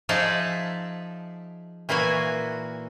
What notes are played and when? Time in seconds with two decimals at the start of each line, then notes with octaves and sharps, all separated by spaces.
0.09 F3 D#4 G#4 D5 E5 A5
1.89 A#2 E3 A#3 F#4 G#5